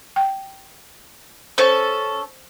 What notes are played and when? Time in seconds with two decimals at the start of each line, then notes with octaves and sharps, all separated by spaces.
0.16 G5
1.58 C#4 A4 C5 A5